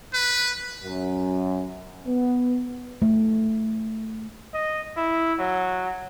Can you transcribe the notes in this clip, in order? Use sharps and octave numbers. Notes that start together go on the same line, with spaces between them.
B4
F#2
B3
A3
D#5
E4
F#3